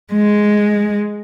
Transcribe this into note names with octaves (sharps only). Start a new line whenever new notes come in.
G#3